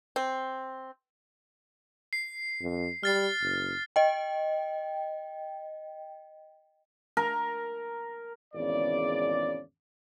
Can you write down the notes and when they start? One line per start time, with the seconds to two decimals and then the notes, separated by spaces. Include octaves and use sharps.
0.16 C4
2.13 C7
2.61 F2
3.03 G3 F6 A6 C7
3.41 F#1
3.96 D#5 G5
7.17 A#4
8.54 G#1 E2 C#3 D5